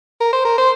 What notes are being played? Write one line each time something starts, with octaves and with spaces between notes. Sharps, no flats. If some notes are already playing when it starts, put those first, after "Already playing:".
A#4
C5
A#4
C5